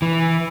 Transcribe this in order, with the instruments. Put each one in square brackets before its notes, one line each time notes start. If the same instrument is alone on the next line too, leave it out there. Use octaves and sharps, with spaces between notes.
[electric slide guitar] E3